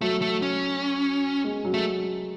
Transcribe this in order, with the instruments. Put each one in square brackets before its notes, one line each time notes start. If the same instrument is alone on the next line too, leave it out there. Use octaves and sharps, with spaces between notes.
[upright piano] F#3 [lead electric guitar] A3
[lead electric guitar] A3
C#4
[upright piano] G#3
F#3
[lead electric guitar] A3